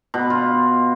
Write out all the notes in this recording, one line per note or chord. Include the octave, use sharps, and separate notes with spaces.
B2
F4